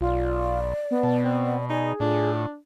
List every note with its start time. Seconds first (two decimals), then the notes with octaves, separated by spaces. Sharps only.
0.01 B1 F4 D5
0.91 B3
1.03 B2 A5
1.24 C4
1.70 D#4 G#4 D5
2.00 A2 D4 F4